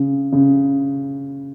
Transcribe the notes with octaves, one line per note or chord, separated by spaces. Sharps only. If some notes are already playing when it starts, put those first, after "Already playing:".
Already playing: C#3
C#3